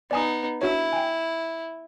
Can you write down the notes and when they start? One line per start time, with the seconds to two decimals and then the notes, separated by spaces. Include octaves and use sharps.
0.11 B3 D#4 D5 G#5 D#6
0.62 D4 E4 F#4 C#5
0.93 G5 G#5